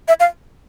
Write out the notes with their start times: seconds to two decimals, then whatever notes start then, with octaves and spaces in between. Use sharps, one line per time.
0.08 E5
0.20 F5